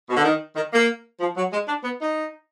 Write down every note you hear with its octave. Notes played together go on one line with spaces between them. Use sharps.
B2
D3
D#3
D#3
A#3
F3
F#3
G#3
D4
B3
D#4